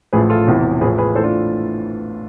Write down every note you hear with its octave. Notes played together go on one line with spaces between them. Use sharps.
A1 A2 F3 G#4 B4
F4 A4
E1 E2 C3 E3
A1 A2 F3 G#4 B4
G#4 B4
A2 E3 A4 C5
D4 F4